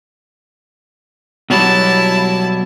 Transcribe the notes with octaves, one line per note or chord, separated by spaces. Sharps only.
B2 F#3 G3 E4 A5